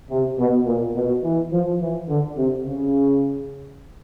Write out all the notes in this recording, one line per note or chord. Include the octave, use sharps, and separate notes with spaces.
C3
B2
A#2
B2
E3
F3
E3
D3
C3
C#3